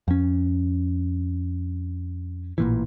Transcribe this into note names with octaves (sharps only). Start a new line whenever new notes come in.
F2 C#4
A1 A#2 E3